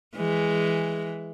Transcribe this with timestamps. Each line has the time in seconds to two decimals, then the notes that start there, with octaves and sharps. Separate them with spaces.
0.16 E3 G#3